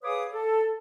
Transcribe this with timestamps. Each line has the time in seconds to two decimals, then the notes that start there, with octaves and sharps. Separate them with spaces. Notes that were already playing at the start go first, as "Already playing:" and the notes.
0.03 G#4 B4 C#5 F5 D6 D#6
0.33 A4